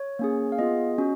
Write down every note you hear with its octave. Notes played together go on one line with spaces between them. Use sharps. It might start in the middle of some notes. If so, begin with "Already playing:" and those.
Already playing: C#5
A#3 C#4 G#4
F5
B3 F4 G#4 D#5
C#4 F#4